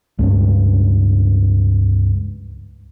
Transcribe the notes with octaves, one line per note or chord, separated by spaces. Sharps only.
C#2 G2 C#4